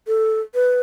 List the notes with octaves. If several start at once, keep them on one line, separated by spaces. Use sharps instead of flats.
A4
B4